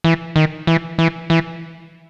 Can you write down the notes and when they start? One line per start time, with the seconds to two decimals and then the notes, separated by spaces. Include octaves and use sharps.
0.04 E3
0.36 D#3
0.67 E3
0.98 E3
1.30 E3